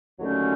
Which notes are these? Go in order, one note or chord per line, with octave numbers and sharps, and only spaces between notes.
D#2 D3 F#3 A3 C#4